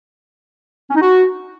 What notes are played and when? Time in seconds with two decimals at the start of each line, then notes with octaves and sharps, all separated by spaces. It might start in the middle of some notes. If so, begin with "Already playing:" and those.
0.89 C#4
0.95 D#4
1.01 F#4